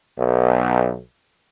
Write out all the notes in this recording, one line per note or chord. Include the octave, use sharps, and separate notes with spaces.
B1